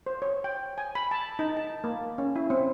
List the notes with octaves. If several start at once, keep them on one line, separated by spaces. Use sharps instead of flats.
C5
C#5
G5
G#5
B5
A5
D#4
A5
A#3
C#4
E4
C4